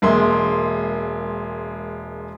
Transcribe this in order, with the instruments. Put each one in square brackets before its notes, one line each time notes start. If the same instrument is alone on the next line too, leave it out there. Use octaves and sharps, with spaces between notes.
[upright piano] E1 G#3 A#3 E5 C6